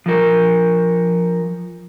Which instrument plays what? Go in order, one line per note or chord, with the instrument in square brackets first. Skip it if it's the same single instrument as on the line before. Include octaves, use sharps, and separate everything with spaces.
[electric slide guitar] F3 A#4